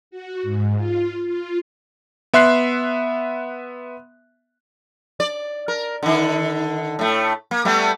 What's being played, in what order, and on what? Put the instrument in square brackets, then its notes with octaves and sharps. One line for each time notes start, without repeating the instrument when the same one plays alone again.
[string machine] F#4
G#2
F4
F4
[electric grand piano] B3 E5 C6 F#6 C7
[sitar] D5
A#4
D3 D#3
A2 A3
A#3
G3 A3 B3